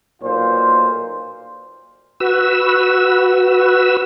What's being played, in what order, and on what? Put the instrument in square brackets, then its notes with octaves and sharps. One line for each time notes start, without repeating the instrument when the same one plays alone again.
[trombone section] B1 A#2 F4 C5
[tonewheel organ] F#4 B4 E6